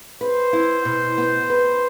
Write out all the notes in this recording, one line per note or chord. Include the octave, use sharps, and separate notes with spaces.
B4 C5
E4
B2
B3
B4